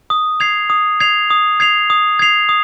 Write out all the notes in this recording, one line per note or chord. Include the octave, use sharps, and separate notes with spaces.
D#6
G#6 C7 F7
D#6
G#6 C7 F7
D#6
G#6 C7 F7
D#6
G#6 C7 F7
D#6